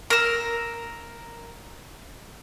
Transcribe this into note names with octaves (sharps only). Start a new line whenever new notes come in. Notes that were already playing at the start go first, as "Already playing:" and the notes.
A#4 E6